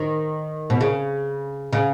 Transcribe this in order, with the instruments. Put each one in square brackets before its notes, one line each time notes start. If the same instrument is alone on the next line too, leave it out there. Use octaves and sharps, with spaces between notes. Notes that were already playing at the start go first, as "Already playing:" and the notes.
Already playing: [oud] D#3
B2
C#3
C#3